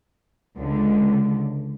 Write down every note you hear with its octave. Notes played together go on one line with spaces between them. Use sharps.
C#2 D3